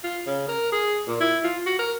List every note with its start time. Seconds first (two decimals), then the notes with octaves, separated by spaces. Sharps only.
0.04 F4
0.26 C#3
0.48 A#4
0.72 G#4
1.08 A#2
1.20 E4
1.44 F4
1.66 F#4
1.79 A#4